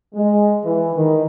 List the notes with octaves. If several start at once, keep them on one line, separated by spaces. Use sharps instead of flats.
G#3
E3
D#3